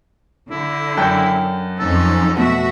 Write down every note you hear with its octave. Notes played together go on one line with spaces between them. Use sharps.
D3 E4
F#2 C#5 G5
F2 C#4 D#4 A4
B2 A3 F#4 E5